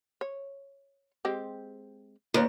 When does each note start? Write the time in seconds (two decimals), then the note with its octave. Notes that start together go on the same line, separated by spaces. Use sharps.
0.21 C#5
1.25 G#3 C4 G4
2.34 D#2 D3 B4 C#5